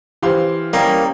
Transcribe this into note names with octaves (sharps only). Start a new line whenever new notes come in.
E3 G4 C5 F5 C6
G3 A#3 C#4 D#4